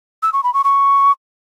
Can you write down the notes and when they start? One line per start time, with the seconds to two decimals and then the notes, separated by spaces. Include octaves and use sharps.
0.23 E6
0.33 C#6
0.43 B5
0.54 C#6
0.64 C#6